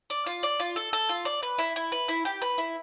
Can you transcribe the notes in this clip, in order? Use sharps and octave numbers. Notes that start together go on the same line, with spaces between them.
D5
F4
D5
F4
A4
A4
F4
D5
B4
E4
E4
B4
E4
G4
B4
E4